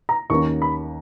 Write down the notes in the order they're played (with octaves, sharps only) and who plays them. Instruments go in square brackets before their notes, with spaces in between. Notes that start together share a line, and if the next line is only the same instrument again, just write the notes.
[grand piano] A#5
[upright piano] D#2 D#3 A#3 C#4 [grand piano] C#6
[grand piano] B5